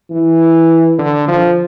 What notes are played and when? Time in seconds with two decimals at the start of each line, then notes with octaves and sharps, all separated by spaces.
0.10 E3
0.99 D3
1.28 F3